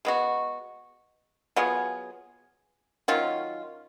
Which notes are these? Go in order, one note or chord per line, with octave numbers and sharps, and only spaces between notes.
G#3 B3 F#4
F#3 B3 F4 G#4
D#3 F#3 C#4 F4